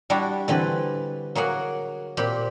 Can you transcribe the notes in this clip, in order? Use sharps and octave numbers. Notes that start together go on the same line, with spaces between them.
G3 D4 E4 F#4
D3 E3 C4 B4
F#3 A#3 G#4 F#5
A#2 C4 G4 B5